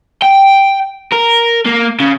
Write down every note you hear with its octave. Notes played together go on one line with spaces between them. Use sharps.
G5
A#4
A#3
C#3